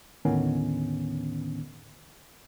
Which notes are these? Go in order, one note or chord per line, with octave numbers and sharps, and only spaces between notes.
D#2 A2 D3 D#3 B3 C#4